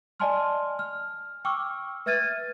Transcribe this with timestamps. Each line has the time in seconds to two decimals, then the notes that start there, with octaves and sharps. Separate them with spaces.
0.20 D5 D#5 G#5 A5 C6 F6
0.79 F6
1.45 G5 C#6 D6 E6 F6
2.06 B4 E5 F6 G#6 A6 D#7